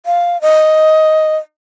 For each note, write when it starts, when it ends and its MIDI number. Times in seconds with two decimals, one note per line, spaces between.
0.06 0.40 77
0.41 1.36 75